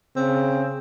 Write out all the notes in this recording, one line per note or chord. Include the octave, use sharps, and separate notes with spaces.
C#3 C4